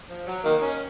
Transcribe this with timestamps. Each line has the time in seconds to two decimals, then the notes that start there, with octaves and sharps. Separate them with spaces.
0.09 F3
0.27 F#3
0.44 D#3 A#3
0.62 C#4